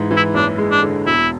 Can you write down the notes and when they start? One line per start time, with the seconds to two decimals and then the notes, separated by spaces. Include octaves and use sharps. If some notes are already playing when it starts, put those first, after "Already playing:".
Already playing: G#2 E3
0.11 E3
0.16 E4
0.34 F#1 D4
0.58 G#3
0.71 D4
0.82 D3
1.06 E1 E4